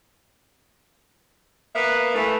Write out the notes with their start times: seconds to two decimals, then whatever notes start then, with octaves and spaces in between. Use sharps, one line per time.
1.75 A#3 B3 B4 E5
2.14 E3 A3